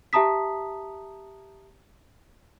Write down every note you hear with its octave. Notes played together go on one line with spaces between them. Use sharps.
G4 E5 A5 A#5 D#6 B6